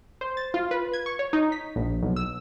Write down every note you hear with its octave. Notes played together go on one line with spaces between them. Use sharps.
C5
A6
F4
B4
G#6
C#6
C#5
D#4
B6
A#1
B1
E6